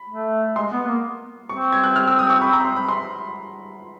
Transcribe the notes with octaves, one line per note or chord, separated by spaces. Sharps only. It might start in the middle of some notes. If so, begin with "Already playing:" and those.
Already playing: B5
A3
G#3 C6
B3
A#3
C4 C#6
G#6
F#6
F6
E6
D#6
C#6
B5
A#5
C6
B5
C6